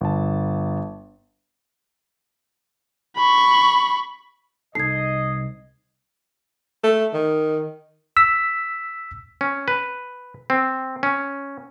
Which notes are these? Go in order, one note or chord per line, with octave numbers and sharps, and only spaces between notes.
G1 A5
B5 C#6
C2 D#4 A4 D#5 G#6 C7
A3
D#3
E6 B6
C#4
B4
C4
C#4